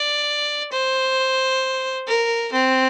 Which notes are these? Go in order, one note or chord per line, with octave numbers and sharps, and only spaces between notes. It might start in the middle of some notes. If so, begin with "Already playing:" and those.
Already playing: D5
C5
A#4
C4